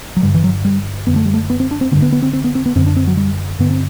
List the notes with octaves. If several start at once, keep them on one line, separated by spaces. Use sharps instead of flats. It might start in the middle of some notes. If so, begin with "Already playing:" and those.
F#3
G2 D3 G3
E3
F#3
G3
F#2 D3 B3
A3
G3
A3
B3
C4
D4
C4
G2 D3 B3
B3
B3
C4
C4
B3
C4
B3
F#2 D3 C4
D4
C4
F#3
G3
G2 D3 B3
C4